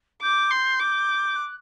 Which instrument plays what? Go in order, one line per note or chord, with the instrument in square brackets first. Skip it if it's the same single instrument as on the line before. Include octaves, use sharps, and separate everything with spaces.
[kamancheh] D6 [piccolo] G6
[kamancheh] C6
D6
[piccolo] F#6